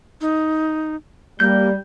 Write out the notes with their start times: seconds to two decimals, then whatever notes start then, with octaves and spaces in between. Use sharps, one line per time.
0.21 D#4
1.40 G3 A#3 G6